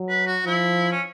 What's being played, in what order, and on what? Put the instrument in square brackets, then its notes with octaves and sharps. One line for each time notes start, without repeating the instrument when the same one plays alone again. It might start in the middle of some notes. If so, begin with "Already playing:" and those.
Already playing: [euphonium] F#3
[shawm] B4
F#4
[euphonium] F3 [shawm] E4
[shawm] C#4